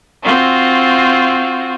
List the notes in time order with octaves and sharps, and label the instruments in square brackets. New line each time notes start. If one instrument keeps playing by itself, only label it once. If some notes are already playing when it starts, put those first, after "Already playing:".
[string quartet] C4 F4 F#4